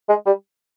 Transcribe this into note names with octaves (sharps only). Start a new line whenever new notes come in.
G#3
G3